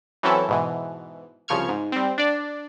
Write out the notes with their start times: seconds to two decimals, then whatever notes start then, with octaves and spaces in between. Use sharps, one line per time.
0.23 E3 F#3 C4 C#4 E4 A4
0.49 G#2 B2 E3
1.48 C2 C#3 F3 C#6 F6 G#6
1.69 G#2
1.92 G3 C4
2.18 D4 D5